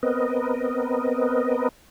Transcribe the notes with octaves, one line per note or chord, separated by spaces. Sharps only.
B3 C4 A#4 B4 D#5